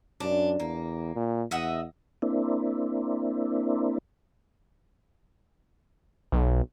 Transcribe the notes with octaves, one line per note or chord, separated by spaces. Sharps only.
F#2 D4
E2 A#3
A#2
E2 D#5 E5 F#5
A#3 C4 D4 E4
B1